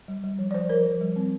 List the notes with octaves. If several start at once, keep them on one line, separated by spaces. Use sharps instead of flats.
G3
G3
F3
D5
F3 C5
F3 A#4
F3
G3
C4